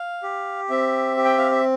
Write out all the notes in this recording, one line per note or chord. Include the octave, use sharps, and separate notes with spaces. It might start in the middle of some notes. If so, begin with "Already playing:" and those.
Already playing: F5
G4
C4 E5
G4
G5
F5
E5